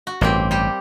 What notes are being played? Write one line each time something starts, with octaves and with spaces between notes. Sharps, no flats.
F#4
A1 G2 A#3 C4 G4
G3 G4